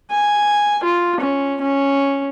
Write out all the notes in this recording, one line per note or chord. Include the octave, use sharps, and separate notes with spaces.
G#5
F4
C#4
C#4